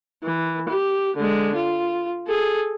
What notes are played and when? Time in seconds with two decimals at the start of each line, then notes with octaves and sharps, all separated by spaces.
0.24 E3
0.69 G4
1.16 D3 G#3
1.55 F4
2.27 G#4 A4